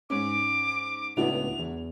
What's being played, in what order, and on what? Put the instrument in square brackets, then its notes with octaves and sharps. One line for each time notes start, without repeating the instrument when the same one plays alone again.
[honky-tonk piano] G#2 C#4 [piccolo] D6
[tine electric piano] C#2 A2 B3 [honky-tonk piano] D4 E4 F#4 [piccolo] F7
[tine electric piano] E2